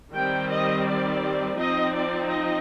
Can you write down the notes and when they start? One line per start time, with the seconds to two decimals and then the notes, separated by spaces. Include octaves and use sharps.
0.12 D#3 G3 C4 G5
0.48 D#5
0.85 D5
1.55 F3 C4 D#4 D#5
1.91 D5
2.28 D#5